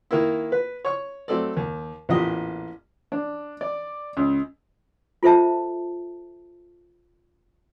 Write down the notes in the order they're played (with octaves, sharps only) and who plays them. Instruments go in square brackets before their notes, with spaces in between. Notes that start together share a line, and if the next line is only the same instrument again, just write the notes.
[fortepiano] D#3 A#3 E4
B4
C#5 C#6
F#3 A3 C4 A4 D5
D#2
A1 E2 A#2 G4 D#5
D4
D5
C#2
[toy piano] F4 A4 C5 E5 A5